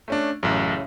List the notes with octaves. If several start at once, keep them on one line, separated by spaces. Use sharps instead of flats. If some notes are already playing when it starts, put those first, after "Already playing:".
A3 C#4 D4
A1 F#2 A2 C#3